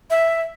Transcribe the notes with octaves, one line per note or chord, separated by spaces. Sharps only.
E5